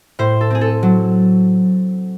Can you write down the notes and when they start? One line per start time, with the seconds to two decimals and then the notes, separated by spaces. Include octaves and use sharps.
0.19 A2 C5
0.41 A4
0.50 C4 G#4
0.61 A4
0.83 F#3